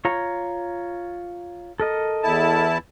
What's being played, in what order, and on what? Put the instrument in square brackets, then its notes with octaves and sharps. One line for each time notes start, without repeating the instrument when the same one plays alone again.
[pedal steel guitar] F4 C#5 A#5
A4 A#4 D#5
[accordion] E2 E4 A5